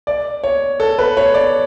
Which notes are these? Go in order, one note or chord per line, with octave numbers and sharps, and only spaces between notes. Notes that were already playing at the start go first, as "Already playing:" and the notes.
D5
C#5
A4
B4
C#5
D5